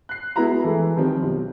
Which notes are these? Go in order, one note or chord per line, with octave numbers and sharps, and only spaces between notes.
F#6 C7
G#3 B3 E4 F#4 A#5 B5
E3 G#3 A3 A4
D#3 F3 G3 C4
B1